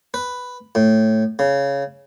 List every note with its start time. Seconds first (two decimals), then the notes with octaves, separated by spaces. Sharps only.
0.14 B4
0.75 A2
1.39 C#3